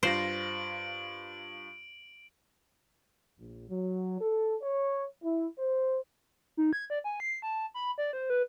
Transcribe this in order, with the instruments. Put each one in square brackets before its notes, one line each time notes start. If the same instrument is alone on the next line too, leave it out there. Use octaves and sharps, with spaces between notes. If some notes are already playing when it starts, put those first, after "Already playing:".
[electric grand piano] G2 F4 A#6 [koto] C5 [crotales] D7 F#7
[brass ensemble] A#1
F#3
A4
C#5
E4
C5
[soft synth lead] D#4
G#6
D5
G#5
C7
A5
B5
D5
C5
B4